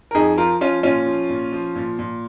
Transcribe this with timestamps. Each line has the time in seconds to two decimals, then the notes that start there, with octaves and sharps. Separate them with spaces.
0.11 A#4
0.15 F2 D#4 G#4
0.38 F3 F4 A#4
0.61 F3 C#4 F4
0.83 A#2 C#4 F4
1.06 F3
1.29 A#2
1.53 F3
1.75 A#2
1.99 A#2